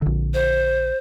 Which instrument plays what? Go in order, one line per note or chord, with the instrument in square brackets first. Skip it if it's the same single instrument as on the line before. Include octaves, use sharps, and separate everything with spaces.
[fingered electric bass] A#1 D3
[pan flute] C5